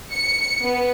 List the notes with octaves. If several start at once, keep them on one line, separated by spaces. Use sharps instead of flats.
C#7
B3